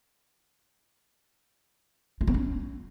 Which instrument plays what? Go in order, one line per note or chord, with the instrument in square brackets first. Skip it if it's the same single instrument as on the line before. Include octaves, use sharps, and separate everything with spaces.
[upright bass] F4
B3
C#4